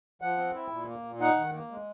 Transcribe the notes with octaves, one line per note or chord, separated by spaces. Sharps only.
F3 F#5
C4
E4
A#2
A#3
A#2
D#4 F#5
D#3
A#3
G#3